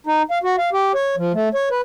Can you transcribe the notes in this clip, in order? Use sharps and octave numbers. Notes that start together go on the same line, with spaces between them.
D#4
F5
F#4
F5
G4
C#5
F3
A3
C#5
B4